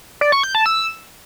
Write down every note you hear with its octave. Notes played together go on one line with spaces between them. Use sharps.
D5
C#6
G6
A5
E6